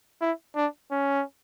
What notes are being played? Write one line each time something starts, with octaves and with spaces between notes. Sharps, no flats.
E4
D4
C#4